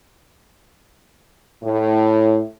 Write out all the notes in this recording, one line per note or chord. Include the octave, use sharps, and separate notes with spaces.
A2